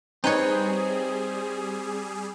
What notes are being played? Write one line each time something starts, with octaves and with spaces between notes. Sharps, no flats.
G3 C4 D#4 G#4 B4 C#5